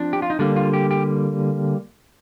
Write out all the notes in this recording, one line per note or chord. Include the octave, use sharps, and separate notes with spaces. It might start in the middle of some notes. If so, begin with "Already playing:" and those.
Already playing: F3 C4 D4
G4
F4
D#4
D3 G3 A#3 D4
F4
G4
G4